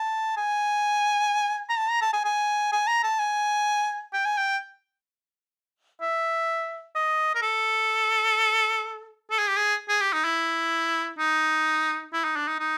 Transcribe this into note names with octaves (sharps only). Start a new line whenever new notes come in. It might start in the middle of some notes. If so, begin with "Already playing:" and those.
Already playing: A5
G#5
A#5
A5
A#5
A5
G#5
G#5
G#5
A#5
A5
G#5
G5
G#5
G5
E5
D#5
A#4
A4
A4
G#4
G4
G#4
G#4
G4
D#4
E4
D#4
E4
D#4
D4
D#4
D#4